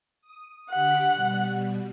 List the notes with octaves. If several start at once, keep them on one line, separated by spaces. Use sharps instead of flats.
D#6
D3 G4 F#5 B6
B2 G3